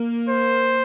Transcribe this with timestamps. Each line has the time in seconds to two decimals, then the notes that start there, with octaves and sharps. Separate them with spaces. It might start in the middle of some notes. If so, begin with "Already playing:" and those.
Already playing: A#3
0.29 C5